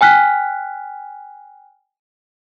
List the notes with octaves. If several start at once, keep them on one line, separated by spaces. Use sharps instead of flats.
G5 G#5 F6 F#6 B6